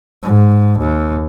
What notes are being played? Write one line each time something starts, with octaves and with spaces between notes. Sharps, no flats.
G#2
D#2